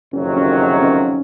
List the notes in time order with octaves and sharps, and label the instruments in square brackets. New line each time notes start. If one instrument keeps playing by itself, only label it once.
[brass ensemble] F#1 F2 C3 D#3 F#3 [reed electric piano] C#4
[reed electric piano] C#4
D#4
C#4